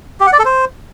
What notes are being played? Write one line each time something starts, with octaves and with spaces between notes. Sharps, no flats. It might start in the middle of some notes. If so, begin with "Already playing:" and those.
G4
F#5
D5
A4
C5